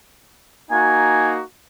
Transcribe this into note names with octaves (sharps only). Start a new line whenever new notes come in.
A#3 D#4 F#4 G#5